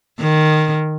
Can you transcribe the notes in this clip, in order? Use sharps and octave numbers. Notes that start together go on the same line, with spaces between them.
D#3